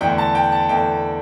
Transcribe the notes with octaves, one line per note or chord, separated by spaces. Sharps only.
E2 D3 A3 G5
A5
G5
A5
E2 D3 A3 G5